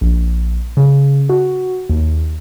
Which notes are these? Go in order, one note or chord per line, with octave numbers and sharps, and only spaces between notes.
A#1
C#3
F#4
D#2